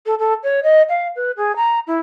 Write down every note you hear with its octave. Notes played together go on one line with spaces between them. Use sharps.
A4
A4
C#5
D#5
F5
B4
G#4
A#5
E4